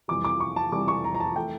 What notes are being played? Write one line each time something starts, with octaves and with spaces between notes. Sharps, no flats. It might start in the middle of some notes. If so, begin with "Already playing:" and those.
F1 F2 E3 G3 D6
D6
C#6
A5
F1 F2 E3 G3 D6
C#6
A#5
A#5
A5
E3 A3 G5